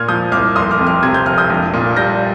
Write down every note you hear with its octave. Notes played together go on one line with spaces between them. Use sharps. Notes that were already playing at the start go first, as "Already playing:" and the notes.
Already playing: A#2 A#3 F6 G#6
F3 D#6 G6
C2 D6 F6
F1 C6 D#6
D6 F6
F2
D6 F6
C3 G#6
G6
F1 F6
D#6 G6
A#1
A#2
G3 G6 A#6